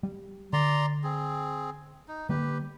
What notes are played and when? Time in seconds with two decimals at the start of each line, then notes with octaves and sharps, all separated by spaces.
0.03 G3
0.53 D3 D5 A#5 C6
1.04 C4 G#4
2.08 D#4
2.29 D3 G3 A#3 G4 B4